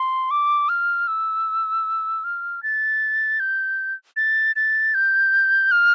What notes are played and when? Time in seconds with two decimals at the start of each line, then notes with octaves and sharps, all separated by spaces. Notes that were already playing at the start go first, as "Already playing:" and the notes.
Already playing: C6
0.31 D6
0.69 F6
1.08 E6
2.24 F6
2.63 A6
3.40 G6
4.17 A6
4.56 A6
4.94 G6
5.72 F6